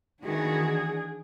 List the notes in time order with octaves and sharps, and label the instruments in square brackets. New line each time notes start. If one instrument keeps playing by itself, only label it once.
[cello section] D#3 E3 F#4 [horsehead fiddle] D4 G#4